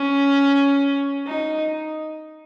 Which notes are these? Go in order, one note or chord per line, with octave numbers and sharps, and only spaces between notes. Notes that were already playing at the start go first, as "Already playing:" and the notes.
Already playing: C#4
D#4